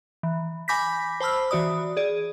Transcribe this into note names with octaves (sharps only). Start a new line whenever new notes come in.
E3
G#5 B5 D6 G6 A#6 B6
C5 A5 B5 E6 F6
E3 F#4 D5 D#6
G#4 D5